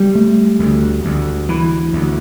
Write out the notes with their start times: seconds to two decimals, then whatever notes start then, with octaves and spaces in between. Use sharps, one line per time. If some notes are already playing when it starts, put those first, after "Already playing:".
Already playing: G3
0.15 A3
0.59 D2
1.05 D2
1.49 E3
1.93 D2